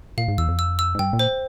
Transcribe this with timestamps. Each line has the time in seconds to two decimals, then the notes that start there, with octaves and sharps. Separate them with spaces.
0.18 A#2 F5
0.28 G#2
0.38 E2 E6
0.48 F2
0.59 E6
0.79 E6
0.95 G#2
0.99 G2 G5
1.13 A#2
1.19 C5